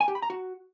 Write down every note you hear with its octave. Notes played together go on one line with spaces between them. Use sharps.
G#5
G4
B5
A#5
F#4